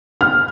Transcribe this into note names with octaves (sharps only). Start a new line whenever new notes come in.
F6